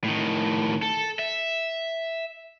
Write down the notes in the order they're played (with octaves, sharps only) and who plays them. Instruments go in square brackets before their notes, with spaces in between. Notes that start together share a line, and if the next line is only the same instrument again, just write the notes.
[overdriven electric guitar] A2 D#3
A4
E5